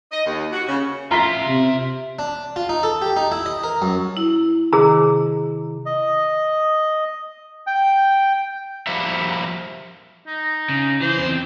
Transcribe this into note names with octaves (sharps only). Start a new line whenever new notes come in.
D#5
D#2
F#4
C#3
F4 E5 A#5 C6 B6
C3
D4
F4
D#4
A4
G4
D#4
E4
D#5
A#4
F#2
E4
C3 D#3 G#4 A#5
D#5
G5
F3 G3 A#3 F#4 E5
D#4
C#3
E3 C5
E2 C4